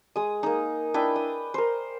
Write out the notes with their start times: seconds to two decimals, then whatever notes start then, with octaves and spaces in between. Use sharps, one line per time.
0.16 G#3 D#6
0.43 A#3 D#4
0.94 D4 E4 B4 G5
1.16 D#6
1.54 A#4 C5